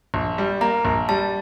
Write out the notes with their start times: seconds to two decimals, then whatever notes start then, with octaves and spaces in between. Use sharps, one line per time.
0.14 A#1
0.38 G3
0.61 A#3 A#5
0.85 A#1
1.09 G3 A5